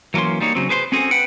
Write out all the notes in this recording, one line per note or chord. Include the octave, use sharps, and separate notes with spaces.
E3 F#3 A#3 C#4 C6
G3 A#3 D#4 C#5
C#3 F#3 C4
G#4 B4 C5 G5 C6
C4 C#4 F#4 G#4 A4 C5
B4 F#5 G5